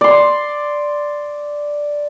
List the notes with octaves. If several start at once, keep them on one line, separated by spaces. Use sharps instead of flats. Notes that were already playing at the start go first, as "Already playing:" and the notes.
D5 C6